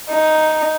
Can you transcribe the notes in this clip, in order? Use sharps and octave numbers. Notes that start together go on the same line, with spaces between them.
D#4